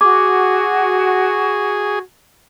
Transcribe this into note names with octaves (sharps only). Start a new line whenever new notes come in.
F#4 G#4 D6